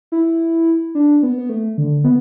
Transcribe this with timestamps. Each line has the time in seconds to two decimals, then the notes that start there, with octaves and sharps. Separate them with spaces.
0.12 E4
0.95 D4
1.23 B3
1.38 B3
1.49 A3
1.78 D3
2.04 B3